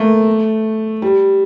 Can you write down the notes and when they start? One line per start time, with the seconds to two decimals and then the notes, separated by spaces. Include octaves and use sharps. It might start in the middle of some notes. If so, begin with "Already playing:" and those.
Already playing: A3 A#3
1.02 G3